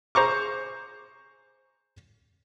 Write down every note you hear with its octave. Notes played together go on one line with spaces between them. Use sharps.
G#4 C5 A#5 C#6 D6